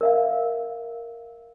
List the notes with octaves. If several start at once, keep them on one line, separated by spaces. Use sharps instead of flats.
A#4 E5 F5